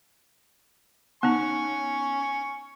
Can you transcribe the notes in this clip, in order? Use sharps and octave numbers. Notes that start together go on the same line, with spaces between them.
B3 D#4 G#5 C#6